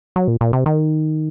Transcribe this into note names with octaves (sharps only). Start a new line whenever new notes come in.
F#3
A#2
A#2
C3
D#3